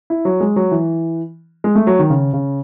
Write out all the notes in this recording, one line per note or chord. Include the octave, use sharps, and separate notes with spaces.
E4
F#3
G#3
F#3
E3
G#3
A3
F#3
D#3
C#3
C#3